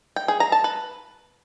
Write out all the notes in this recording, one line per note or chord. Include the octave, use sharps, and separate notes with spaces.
G5
G#4
A#5
A5
B4